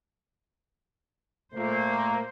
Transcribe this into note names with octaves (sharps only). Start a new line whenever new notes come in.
A#2 A3 A#3 C5